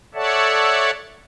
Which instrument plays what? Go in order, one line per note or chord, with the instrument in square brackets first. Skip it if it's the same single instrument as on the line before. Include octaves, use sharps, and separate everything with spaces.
[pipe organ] A4 C#5 D5 E5 F#5 A5